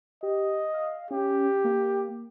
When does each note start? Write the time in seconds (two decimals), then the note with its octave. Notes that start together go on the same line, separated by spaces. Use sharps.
0.23 G4 D#5
0.74 F5
1.11 C#4 G4
1.65 A#3